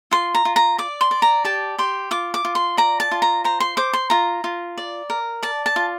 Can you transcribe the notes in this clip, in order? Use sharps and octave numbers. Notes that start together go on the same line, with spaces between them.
F4 C6
A#5
F4
A#5
D5 D6
C6
D5
A#5
G4 A5
G4 C6
F4 D6
D6
F4
C6
D5 A#5
A5
F4
A#5
C5 A#5
C6
C5 D6
C6
F4 A#5
F4
D5
A#4
D5 A5
A5
F4